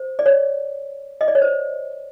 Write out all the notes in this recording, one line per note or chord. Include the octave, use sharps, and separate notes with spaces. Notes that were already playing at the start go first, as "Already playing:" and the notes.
Already playing: C5
D5
C#5
D#5
D5
C#5
C5